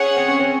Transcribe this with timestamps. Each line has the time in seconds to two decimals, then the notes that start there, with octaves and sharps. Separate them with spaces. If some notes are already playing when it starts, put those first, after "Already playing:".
Already playing: C#4 G#4 C#5 F#5
0.17 C4
0.28 C#4
0.40 C4